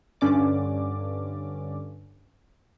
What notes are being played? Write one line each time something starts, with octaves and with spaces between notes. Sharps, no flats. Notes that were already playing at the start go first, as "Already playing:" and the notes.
G2 D3 C#4 D5 D6